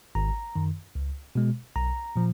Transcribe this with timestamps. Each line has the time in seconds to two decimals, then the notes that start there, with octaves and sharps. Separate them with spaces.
0.15 G#1 A#5
0.56 F#2 D#3
0.95 C#2
1.35 B2 G#3
1.76 B1 A#5
2.16 A#2 F3